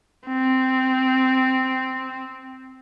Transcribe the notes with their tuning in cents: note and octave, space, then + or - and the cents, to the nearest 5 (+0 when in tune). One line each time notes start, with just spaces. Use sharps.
C4 -5